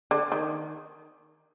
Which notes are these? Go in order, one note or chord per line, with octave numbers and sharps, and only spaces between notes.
D3
D#3